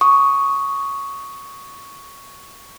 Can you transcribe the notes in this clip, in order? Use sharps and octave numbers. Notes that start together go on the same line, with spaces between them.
C#6 D#6